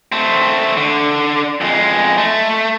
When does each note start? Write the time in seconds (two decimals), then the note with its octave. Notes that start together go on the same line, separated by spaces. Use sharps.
0.12 A3 C4
0.77 D3
1.61 F2 G#3
2.18 A3